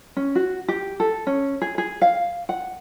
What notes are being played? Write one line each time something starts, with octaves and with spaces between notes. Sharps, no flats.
C#4
F#4
G4
A4
C#4
G#4
G#4
F5
F#5